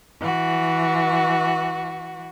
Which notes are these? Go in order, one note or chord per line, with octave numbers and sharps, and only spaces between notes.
E3 F#4